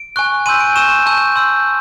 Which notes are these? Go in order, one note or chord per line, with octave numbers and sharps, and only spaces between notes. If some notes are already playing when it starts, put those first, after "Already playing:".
Already playing: D7
G#5 C#6 F#6
G#5 C6 E6 G6 D#7
D7
C#6 E6 G6 E7
A5 C#6 E6 G6
C6 E6 G6